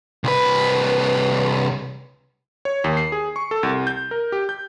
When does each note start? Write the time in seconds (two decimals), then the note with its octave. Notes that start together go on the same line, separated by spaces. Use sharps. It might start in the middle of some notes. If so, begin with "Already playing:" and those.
0.24 C2 B4
2.65 C#5
2.84 D#2
2.97 C7
3.12 G#4
3.36 C#6
3.51 A4
3.63 C2
3.87 G6
4.11 A#4
4.32 G4
4.49 G6